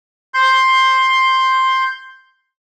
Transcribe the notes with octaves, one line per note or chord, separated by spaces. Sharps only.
C6 G6